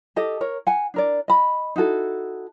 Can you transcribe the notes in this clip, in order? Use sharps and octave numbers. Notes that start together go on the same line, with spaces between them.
G4 A4 D#5
A#4 C#5
F#5 G#5
D4 A#4 D5
D#5 B5
D#4 E4 F#4 A4